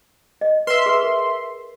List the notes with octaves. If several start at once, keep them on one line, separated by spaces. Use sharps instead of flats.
D#5
B4 E5 C6
G#4 B4
A#4